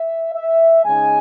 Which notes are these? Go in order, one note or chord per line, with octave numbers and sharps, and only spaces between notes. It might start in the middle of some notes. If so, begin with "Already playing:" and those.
Already playing: E5
E5
C#3 G#3 D#4 G#5